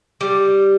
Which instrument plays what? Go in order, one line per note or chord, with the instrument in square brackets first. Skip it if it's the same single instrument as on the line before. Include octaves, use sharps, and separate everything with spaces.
[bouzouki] G3